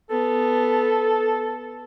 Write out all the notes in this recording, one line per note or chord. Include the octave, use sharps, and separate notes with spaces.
B3 A4